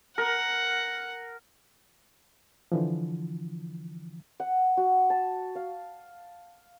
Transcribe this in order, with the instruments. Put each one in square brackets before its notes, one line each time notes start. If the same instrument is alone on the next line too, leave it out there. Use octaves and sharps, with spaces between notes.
[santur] A#4 [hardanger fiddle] F#5
[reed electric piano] D3 E3 F3
[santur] F#5
F#4
A5
F5